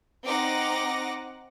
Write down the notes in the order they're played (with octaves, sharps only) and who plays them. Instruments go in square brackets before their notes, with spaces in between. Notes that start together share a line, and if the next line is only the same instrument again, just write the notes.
[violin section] C4 D#4 F#5 D6 A#6